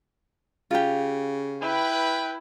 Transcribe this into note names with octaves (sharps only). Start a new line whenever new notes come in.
C#3 F4 G4
E4 B4 G5